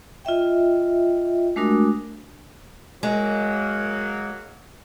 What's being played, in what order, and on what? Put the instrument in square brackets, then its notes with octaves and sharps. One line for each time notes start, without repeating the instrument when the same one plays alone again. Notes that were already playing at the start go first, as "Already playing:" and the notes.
[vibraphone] F4 D#5 E5 G5
G#3 A3 D4 F#4 A#4 D#6
[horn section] F#3 A#3 [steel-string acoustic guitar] G#3